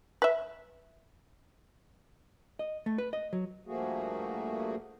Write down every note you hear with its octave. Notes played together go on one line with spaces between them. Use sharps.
B4 E5
D#5
A3
B4
D#5
F#3
G2 F3 A3 A#3 F#4 G#4